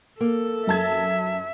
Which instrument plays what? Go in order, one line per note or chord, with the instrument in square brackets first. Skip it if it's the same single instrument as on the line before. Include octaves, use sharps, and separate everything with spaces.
[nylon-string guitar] A#3 [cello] A4
[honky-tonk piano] F#2 A5 G#6 [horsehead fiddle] E5